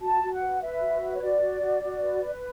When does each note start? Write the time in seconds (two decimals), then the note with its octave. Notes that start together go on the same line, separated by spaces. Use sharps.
0.02 F#4 A5
0.22 F#4
0.32 F#5
0.42 B4
0.62 B4 E5
0.82 F#4
1.01 B4
1.15 C#5
1.22 F#4 D5
1.42 F#4
1.61 F#4
1.82 F#4
2.01 B4
2.20 B4